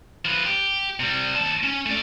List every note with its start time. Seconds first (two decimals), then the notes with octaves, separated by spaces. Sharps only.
0.25 F3 B4
0.45 G4
1.00 C3 G3
1.35 D#2 A5
1.63 C#4
1.86 A3 D5